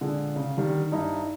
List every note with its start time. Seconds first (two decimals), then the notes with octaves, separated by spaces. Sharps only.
0.01 A#2 D3 G#3
0.36 C#3
0.57 D3 D#3 G3
0.92 G2 D#4 E4